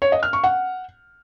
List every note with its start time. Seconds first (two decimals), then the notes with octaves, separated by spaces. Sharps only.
0.02 C#5
0.12 D#5
0.23 F6
0.33 C#6
0.44 F#5